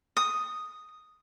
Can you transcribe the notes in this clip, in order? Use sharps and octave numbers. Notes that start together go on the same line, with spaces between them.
D#6